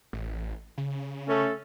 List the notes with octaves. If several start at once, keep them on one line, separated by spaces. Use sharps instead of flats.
A1
C#3
A3 C#4 A4